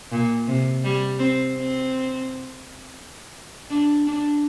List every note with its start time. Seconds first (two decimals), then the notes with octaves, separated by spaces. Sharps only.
0.12 A#2
0.48 C3
0.84 G3
1.19 C4
1.56 C4
3.70 D4
4.07 D4